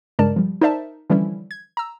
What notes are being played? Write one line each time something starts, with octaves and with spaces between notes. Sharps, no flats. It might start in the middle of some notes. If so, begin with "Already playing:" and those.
G2 C#3 G#3 A#4 D5 A5
F3 G3
D#4 A#4 C5 D5 E5 A5
D3 E3 F3 G3 C#4 E4
G#6
A#5 E6